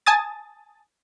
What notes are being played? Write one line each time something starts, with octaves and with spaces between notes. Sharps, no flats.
G#5 A5 D#6 A6